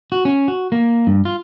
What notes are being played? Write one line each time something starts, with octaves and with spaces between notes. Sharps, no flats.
F#4
C#4
F#4
A#3
G2
F4